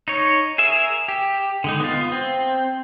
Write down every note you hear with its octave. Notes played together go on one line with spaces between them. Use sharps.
D#4 C#5
G#4 A#4 E5
G4
D3 G#3 D#4
B3 F4
C4